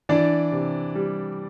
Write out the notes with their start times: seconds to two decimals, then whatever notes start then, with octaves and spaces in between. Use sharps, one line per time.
0.09 E3 D4 D5
0.52 C3
0.95 G3